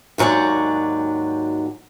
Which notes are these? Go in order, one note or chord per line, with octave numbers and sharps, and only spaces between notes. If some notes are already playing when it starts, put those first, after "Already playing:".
D#2 G#2 F#3 F#4 D5